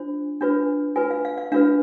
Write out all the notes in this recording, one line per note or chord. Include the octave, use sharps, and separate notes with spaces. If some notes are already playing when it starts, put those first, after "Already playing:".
Already playing: D4 F4 C5
D4 F4 B4
F4 B4 G#5
F5
F5
F5
D4 F4 B4 F5